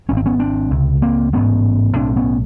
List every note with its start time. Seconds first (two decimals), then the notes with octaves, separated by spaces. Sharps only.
0.09 G#1 G#2 C#4
0.17 C4
0.26 B3 C#4
0.39 C4 D4
0.71 C#2 C3
1.02 A#3 C4
1.33 A1 G#2 B3 C#4
1.96 B1 A2 C4 D4
2.17 B3 C#4